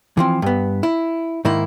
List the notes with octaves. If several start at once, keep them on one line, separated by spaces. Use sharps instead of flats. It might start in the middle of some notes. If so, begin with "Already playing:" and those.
E3 F3 C4
G2 B3
E4
G#2 D#3 A#3 E4